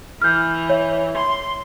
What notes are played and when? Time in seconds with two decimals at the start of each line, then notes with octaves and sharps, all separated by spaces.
0.22 E3 F6 G6
0.69 C#5 E5
1.15 C6